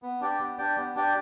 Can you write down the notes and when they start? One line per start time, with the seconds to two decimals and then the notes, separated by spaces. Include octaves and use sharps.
0.02 B3
0.21 D4 G4 D5 G5
0.39 B3
0.58 D4 G4 D5 G5
0.77 B3
0.95 D4 G4 D5 G5